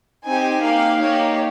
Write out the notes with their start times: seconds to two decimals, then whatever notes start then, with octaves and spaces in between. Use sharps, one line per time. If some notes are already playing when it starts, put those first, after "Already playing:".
0.25 C4 D#4 G4 G#5
0.62 A#3 D#4 G4 F5
1.00 A#3 D#4 G4 C#5